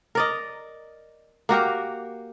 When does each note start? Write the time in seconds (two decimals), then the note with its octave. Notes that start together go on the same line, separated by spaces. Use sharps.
0.15 A#4 D5 D#5
1.49 A#3 F#4 G4 A#4